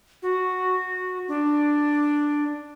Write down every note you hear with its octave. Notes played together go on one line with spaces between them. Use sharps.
F#4
D4